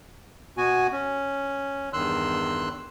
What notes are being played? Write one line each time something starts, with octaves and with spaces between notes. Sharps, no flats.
B2 B3 F#4 G#5
C#4
E2 G2 D#3 C6 E6 F#6